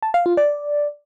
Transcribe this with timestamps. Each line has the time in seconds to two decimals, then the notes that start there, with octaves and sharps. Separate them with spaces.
0.03 A5
0.14 F5
0.26 F4
0.37 D5